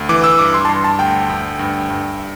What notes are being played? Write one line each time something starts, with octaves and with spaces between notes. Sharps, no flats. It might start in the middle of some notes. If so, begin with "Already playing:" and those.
Already playing: D2
E3 D6
E6
G2 D6
C6
A5
G2 C6
A5
D2 G5
D2
G2
G2